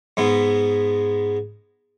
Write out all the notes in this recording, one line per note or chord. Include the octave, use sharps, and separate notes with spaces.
G#2 G#3 B3